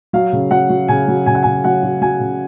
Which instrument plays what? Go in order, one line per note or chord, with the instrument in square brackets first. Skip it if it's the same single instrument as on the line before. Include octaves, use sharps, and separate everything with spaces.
[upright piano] F#3 F5
C#3
F#3 F#5
F#3
C#3 G#5
F#3
C#3 G#5
F#5
C#3 G#5
F#3 F#5
F#3
F#3 G#5
C#3